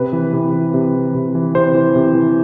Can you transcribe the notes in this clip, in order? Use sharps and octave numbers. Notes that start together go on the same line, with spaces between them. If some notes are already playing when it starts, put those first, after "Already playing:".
Already playing: C3 B4
E3
C3
E3
C3
E3
C3
E3
C3 C5
E3
C3
E3